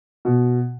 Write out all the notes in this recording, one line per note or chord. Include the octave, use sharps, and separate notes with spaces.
B2